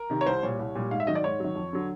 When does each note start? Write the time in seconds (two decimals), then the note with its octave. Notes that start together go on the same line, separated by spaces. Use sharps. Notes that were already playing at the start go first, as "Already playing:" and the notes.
Already playing: A#4
0.10 C3 D#3
0.21 C#5
0.26 C2 C5
0.43 A#2 G3 C#5
0.59 C2
0.75 A#2 G3
0.91 G#2 F5
1.00 E5
1.07 D#3 F#3 D#5
1.15 D5
1.24 G#2 C#5
1.40 D#3 F#3
1.56 F2
1.73 D3 F#3